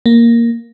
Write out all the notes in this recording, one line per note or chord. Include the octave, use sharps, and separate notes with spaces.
A#3